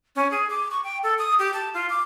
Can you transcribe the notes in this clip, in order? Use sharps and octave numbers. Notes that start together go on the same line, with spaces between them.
C#4
G#4
D6
C#6
G5
A4
D#6
G4
A5
F4
D6